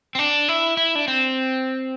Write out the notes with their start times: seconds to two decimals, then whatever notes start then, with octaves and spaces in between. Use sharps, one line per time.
0.15 C4
0.19 D4
0.48 E4
0.77 E4
0.95 D4
1.08 C4